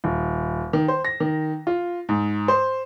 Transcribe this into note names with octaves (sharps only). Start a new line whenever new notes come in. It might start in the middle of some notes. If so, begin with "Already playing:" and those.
D#1
D#3
C5
A#6
D#3
F4
G#2
C5